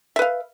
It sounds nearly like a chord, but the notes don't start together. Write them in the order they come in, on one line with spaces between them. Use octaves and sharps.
E5 B4 F5